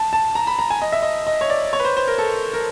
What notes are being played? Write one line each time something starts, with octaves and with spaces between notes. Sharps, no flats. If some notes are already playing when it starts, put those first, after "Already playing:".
Already playing: A5
A5
A#5
B5
A#5
G#5
D#5
E5
D#5
D#5
C#5
D5
C#5
B4
C5
C5
A#4
A4
A#4